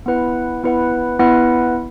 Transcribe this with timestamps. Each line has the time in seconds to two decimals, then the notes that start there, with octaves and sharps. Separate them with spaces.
0.06 B3 E4 B4 F#5
0.63 B3 E4 B4 F#5
1.19 B3 E4 B4 F#5